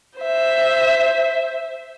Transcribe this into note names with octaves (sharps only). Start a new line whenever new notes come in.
C5 E5